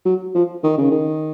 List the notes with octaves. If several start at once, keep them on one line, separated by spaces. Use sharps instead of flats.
F#3
F3
D#3
C#3
D#3